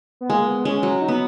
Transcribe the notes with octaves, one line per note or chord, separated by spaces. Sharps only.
B3
G#3 A#3
B3
G#3 C#4
F#3
D#4
B3